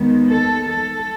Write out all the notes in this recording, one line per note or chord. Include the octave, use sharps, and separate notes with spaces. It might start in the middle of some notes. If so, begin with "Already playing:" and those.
Already playing: D#2 D#3 G#3 B3
A4
A4